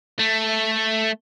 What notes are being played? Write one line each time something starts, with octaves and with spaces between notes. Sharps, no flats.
A3